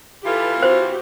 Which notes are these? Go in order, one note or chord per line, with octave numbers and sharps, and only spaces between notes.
E3 F4 G4 A4 B4
C4 F#4 G4 C5